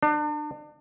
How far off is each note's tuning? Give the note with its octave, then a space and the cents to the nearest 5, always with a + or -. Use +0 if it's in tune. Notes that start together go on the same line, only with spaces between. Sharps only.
D4 +35